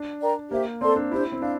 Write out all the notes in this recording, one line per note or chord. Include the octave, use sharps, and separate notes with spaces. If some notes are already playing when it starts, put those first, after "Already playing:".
Already playing: D4
A#4 D5 G5 A#5
A#3 G4 C5 E5
C4 A4 D5 A5 C6
D4
D4 E4 G4 C5
C4
D4 F5